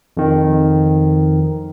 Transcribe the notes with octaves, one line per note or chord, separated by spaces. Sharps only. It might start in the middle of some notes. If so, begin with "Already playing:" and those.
F2 D#3